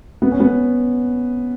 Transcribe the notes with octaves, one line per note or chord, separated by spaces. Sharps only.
B3
C#4
B3